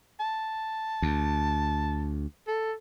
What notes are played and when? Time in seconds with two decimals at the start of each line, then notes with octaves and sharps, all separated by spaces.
0.20 A5
1.02 D2
2.47 A4